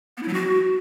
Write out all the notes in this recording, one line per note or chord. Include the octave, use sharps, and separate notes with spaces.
B3
E4
F#3
F#4